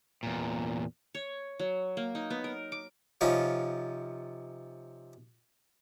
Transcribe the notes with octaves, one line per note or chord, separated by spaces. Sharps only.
E2 A#2
C#5
F#3
A#3
D#4
B3
A#4
D6
C3 F3 C#4 D#4 F4